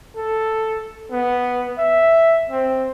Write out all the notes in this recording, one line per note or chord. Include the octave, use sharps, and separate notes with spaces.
A4
B3
E5
C4